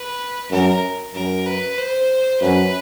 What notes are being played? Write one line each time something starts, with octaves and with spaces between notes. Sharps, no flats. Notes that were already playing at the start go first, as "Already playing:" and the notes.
Already playing: B4
F#2 A#4
F#2 A#4
B4
C5
F#2 B4